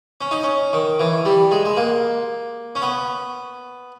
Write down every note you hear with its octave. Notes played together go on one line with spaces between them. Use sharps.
C#4
D#4
C#4
D#3
E3
G3
G#3
G#3
A#3
C#4
B3